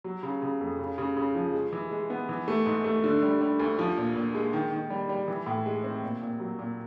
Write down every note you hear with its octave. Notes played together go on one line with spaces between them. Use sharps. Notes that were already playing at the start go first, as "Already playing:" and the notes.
F#3
C#3
C#3
F2
C#3
C#3
C#3
F3
G#3
E3
G#3
B3
E3
A3
G#2
A3
D3
G3
G3
D2
F3
A#2
A#2
G#3
D#3
D#3
G3
G3
E3
A2
G#3
C4
A#2
A#2
F#3
A#2